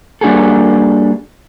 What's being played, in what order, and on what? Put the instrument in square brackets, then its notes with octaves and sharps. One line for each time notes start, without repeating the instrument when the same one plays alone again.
[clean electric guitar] G3 A#3 D4 F#4 G#4 A4